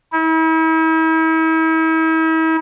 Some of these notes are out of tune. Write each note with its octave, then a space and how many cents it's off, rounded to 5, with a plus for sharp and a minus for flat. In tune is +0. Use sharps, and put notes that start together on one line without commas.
E4 -40